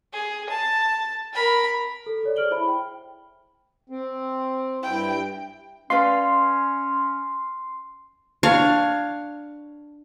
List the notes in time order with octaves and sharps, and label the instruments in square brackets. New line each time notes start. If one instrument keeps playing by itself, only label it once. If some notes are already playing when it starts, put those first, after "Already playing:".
[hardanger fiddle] G#4
A5
A#4 B5
[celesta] A4
A4 C#5 D5
G#4 C5 F6 D7 F#7 G7
E4 C5 E5 B5
G5
[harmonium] C4
[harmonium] G2 E4 [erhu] G5
[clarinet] C#4 [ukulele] B4 D5 F5 [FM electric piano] C6
[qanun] D4 C#5 F5